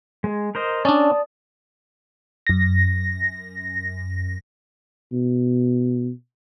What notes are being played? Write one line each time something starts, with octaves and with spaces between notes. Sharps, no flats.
G#3
A#4 C5 D#5
C#4 D4 D5 A5 D#6
F#2 A#6
B2